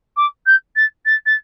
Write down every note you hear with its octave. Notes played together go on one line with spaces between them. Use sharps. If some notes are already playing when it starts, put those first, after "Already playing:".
D6
G6
A6
A6
A6